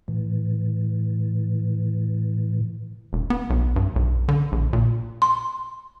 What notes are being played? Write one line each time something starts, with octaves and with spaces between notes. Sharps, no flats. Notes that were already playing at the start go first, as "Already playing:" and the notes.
A2 E3
E1
B3
B1
G2
B1
D3
A#1
A#2
C6